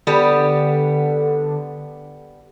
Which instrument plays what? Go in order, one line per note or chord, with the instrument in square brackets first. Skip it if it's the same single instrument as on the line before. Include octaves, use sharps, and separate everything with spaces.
[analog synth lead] D3 [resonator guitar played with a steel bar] G3 B3